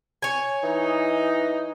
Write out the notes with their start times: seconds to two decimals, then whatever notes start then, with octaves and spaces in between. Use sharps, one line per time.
0.22 C#5 G#5
0.63 E3 D#4